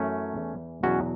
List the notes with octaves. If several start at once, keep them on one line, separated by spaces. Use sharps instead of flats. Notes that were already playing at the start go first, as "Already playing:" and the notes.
Already playing: F#2 E3 A3 C#4
E2 E3
E2 B2 F#3 C#4 F#4